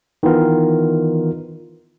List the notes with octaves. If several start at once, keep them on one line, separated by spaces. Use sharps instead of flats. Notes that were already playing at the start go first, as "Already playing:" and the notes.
D#3 E3 B3 F4 A#4